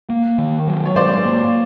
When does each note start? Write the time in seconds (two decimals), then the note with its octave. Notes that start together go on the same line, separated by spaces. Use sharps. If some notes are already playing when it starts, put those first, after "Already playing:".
0.10 A#3
0.38 D#3
0.67 F#3
0.85 C#5
0.96 G#2 C5 D5
1.25 A#3